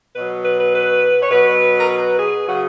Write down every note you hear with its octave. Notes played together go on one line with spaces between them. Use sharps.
B2 F#3 B4
B4
B4
B4
C#5
B2 F#3 B4
A#4
B4
G#4
C#3 F#3 F#4